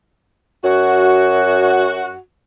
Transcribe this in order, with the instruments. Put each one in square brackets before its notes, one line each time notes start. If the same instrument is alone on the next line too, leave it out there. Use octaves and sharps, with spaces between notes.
[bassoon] F#2 [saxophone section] F#4